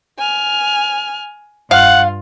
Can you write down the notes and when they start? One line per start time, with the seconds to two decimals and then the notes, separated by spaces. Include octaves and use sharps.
0.20 G#5 F6
1.71 G2 F4 F5 F#5